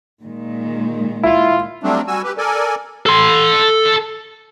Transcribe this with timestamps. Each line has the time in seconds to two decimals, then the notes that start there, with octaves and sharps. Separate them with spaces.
0.22 A#2 D#3 G#3
1.23 E4 F4
1.84 F#3 G3 A3 C4 D4
2.07 G3 F#4 G#5 E6
2.24 G4 B4
2.38 A4 A#4 D5 G#5
3.06 A4 C6